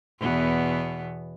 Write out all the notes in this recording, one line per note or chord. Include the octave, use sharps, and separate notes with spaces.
E2 B2 B3